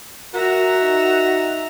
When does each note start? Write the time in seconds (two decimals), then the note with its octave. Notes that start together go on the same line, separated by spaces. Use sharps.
0.34 F#4 A#4 E5 A#5
0.82 D#4